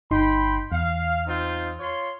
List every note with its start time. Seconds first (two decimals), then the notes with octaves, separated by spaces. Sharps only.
0.11 G1 D#4 G5 B5 C6
0.72 E2 F5
1.27 C4 D#4 F4
1.80 F4 C#5 C6